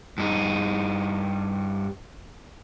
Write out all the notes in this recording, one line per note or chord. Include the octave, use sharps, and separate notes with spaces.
G2 D#4